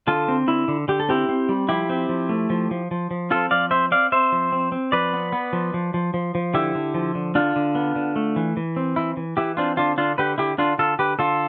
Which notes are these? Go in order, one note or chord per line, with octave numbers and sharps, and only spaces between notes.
D3 F4 A4
C4
D3 E4
D3
D3 G4
A4
C4 E4 G4
C4
G3
F3 E4 G4
C4
F3
A3
F3
F3
F3
F3
C4 F4 A4
F3 D5 F5
C4 C5 E5
C4 D5 F5
C4 C5 E5
F3
C4
C4
F3 B4 D5
B3
B3
F3
F3
F3
F3
F3
D3 E4 G4
D3
F3
D3
D3 D4 F4
D3
B3
D3
A3
E3
E3
C4
E3 E4
E3
E3 E4 G4
C4 D4 F4
D3 D4 F4
D3 D4 F4
D3 G4 B4
D3 E4 G4
D3 D4 F4
D3 F4 A4
D3 G4 B4
D3 F4 A4